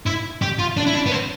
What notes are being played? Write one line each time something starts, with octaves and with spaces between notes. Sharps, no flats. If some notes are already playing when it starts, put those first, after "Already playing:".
E4
G4
F4
D4
E4
D4
B3
C4